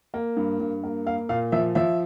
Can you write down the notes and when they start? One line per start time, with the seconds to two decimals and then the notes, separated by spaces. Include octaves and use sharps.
0.14 A#3
0.37 G2
0.60 G2
0.83 A#3
1.06 A#3 F5
1.29 A#2 F5
1.52 F3 E5
1.75 F3 E5